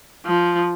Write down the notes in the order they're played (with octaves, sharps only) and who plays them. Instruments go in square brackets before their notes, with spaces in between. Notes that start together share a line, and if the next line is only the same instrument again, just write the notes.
[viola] F3